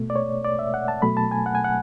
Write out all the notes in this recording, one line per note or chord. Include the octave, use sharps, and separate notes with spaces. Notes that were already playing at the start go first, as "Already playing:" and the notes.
Already playing: B2 A3
D5
C#5
D5
E5
F#5
A5
B2 F#3 A3 B5
A5
G#5
F#5
G#5
F#5